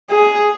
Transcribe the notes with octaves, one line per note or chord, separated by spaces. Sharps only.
G#4